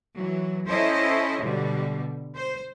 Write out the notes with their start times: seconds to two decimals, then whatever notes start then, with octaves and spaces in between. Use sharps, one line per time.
0.14 E3 F#3
0.66 C#4 E4 A4 C5 C#5 D#5
1.40 B2 D3 G3
2.34 C5